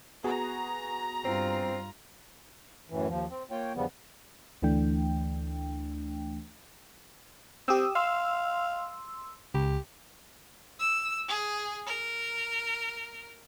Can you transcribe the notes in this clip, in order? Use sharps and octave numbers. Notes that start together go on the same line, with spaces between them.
B3 F#4 G#4 A#5
G2 C4 F4
F#2 A2 E3
D#2 F3
C4
A#3 F4 C#5 G5
E2 G2 C#3 F3 G3 B3
D2 E3 A3 D4 G5
C4 G4 D#6 E6
F5 C6 E6
C#2 G4
E6
G#4
A#4